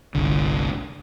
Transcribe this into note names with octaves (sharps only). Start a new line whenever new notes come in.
G1 C2 D3